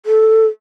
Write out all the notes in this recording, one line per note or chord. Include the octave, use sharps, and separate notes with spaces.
A4